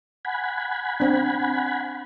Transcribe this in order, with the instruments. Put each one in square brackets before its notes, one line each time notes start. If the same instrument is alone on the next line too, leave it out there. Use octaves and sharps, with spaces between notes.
[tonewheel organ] F#5 G#5 B5
[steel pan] C4 D4